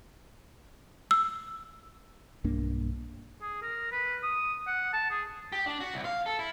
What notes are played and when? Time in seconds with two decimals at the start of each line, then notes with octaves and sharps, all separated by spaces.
1.11 E6
2.44 B1 G2 A#3 D4
3.41 G#4
3.62 A#4
3.92 B4
4.23 D#6
4.67 F#5
4.93 A5
5.10 G#4
5.52 G4
5.66 D4
5.80 F#4
5.94 C2
6.05 F5
6.26 A4
6.39 E4